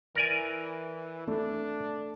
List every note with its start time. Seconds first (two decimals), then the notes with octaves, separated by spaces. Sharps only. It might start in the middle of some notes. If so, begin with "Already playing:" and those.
0.15 E3 A#4 D5 G#5
1.27 A3 D4